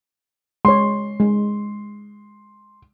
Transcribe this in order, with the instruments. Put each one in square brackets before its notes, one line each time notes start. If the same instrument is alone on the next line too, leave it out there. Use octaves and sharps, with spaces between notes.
[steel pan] G#3 C#5 [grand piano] C6
[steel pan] G#3